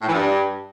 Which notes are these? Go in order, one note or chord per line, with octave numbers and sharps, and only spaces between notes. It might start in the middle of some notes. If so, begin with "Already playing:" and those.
A2
E3
G2